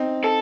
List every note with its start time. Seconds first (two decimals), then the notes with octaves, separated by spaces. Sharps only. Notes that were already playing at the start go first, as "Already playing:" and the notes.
Already playing: C4 D#4
0.24 A4